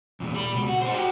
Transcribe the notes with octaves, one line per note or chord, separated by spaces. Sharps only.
E2 A#2
G3 B5
C#2 B2
F#4
D#4 C5
F#4 G4